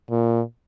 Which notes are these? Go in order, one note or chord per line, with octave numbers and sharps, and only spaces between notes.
A#2